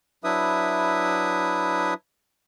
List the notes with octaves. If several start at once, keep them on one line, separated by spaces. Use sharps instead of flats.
F#3 D4 E4 B4 E5 D#6